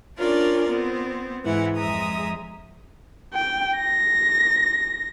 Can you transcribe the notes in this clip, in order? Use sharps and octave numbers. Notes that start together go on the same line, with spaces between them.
C#4 D4 F4 A#4 D5
B3 C4
G#2 E3 E4 F#5
F2 G#3 E5 A#5 D#6
G5
A#6